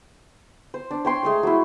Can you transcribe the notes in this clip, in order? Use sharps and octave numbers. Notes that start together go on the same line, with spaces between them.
C5
D4
C#5 G5 C6
G#3 A3 C6
F#3 E4